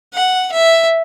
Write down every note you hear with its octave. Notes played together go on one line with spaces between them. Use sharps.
F#5
E5